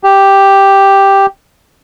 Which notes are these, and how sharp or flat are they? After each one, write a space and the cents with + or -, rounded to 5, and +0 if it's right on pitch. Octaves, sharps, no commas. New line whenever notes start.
G4 +0